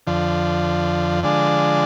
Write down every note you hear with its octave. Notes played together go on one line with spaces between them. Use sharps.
F2 D3 F3
D3 F3 G#3 D4